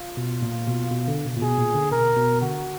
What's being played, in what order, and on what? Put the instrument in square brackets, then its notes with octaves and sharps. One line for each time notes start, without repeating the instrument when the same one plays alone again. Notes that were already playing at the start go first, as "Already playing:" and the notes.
Already playing: [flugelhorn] F4
[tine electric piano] B2
A#2
B2
B2
D3
B2
A#2
[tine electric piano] B2 [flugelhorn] G#4
[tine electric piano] A#2
D3
[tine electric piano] B2 [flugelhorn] A#4
[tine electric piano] B2
[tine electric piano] D3 [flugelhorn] F#4